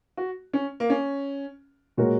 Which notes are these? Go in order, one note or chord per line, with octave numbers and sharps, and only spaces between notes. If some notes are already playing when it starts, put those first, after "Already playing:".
F#4
C#4
A#3
C#4
A#2 G#3 F#4 A#4 C#5